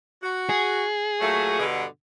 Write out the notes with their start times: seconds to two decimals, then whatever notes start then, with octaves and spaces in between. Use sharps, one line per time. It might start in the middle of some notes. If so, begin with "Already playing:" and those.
0.23 F#4
0.49 G#4
1.21 A#2 F#3 A3
1.59 G2 B2 D3